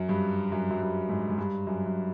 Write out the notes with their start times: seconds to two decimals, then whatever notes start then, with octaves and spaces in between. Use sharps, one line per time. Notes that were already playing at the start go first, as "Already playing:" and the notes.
Already playing: F#2
0.09 G2
0.52 F#2
0.70 F#2
0.81 G2
1.09 G#2
1.30 G#2
1.38 G2
1.67 F#2
1.86 F#2